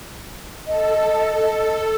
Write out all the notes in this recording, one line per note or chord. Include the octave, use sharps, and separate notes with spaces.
A4 D#5